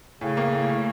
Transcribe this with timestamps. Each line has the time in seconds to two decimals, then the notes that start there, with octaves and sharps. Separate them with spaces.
0.21 A2 C#3
0.37 A#3
0.53 A2
0.69 A2